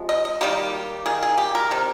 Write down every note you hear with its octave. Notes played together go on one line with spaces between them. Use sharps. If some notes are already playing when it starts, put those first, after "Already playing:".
Already playing: C3 F3 G#3
D#5
D#5
D#3 G3 A#3 G4
D#3 A#3 G#4
G#4
G4
A#4
C3 D#3